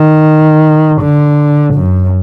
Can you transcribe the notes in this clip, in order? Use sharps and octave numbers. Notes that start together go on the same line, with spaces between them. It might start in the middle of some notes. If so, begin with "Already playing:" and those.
Already playing: D#3
D3
F#2